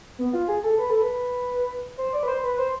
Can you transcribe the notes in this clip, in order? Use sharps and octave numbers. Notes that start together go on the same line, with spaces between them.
B3
F4
G#4
A4
B4
A4
B4
C5
D5
B4
C5
B4
C5